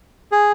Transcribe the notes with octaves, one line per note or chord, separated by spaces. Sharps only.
G#4